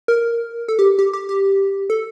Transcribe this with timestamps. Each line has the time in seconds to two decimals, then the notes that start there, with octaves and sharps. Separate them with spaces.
0.08 A#4
0.68 A4
0.79 G4
0.99 G4
1.13 G4
1.29 G4
1.90 A4